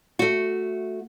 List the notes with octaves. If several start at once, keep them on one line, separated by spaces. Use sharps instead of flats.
A3 F#4